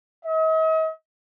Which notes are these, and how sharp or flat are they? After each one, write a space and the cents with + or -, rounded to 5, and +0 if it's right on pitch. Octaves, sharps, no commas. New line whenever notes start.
D#5 +45